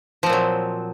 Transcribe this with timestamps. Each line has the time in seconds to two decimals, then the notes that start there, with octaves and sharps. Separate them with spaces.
0.23 F3
0.26 C4
0.29 A#2
0.33 F#3